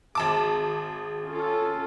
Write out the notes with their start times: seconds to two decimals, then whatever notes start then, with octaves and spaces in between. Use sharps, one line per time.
0.15 G#1 G#4 A5 D6
1.26 C#4 F4 A4